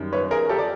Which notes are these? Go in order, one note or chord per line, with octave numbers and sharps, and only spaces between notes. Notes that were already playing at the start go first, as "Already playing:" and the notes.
Already playing: F#2 D#3 G3
B4 C#5
G#4 A#4
G4 A4
D5